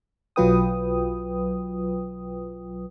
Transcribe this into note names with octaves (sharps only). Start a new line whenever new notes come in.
B1 F#3 F4 B4 G5 D#6